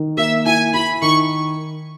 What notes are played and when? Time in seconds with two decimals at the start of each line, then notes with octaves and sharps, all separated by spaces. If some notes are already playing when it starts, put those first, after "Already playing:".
Already playing: D#3
0.17 A#3 E5
0.45 E4 G#5
0.74 E4 B5
1.02 D#3 C#6